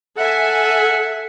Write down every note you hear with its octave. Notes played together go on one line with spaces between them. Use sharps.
A4 E5 F#5 G#5